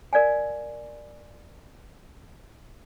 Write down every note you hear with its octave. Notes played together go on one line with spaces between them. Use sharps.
A#4 D5 F5 G#5